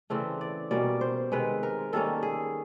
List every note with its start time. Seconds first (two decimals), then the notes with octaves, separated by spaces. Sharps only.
0.10 C#3 E3 A3 C4 D5
0.41 D5
0.71 B2 G3 A#3 C#4 D5
1.01 C5
1.32 C3 D#3 G#3 B4
1.63 A#4
1.93 D#3 G3 A#3 C#4 A4
2.23 G#4